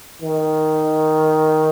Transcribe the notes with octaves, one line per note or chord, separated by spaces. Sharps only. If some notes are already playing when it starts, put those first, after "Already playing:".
D#3